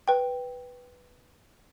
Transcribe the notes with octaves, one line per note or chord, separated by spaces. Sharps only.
B4 G5